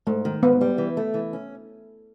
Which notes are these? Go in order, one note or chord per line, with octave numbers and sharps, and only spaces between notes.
G#2 A3
D#3
G#2 B3
G3
E3
A3
E3
C#4